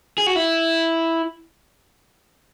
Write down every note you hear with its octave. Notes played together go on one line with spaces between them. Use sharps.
G#4
F#4
E4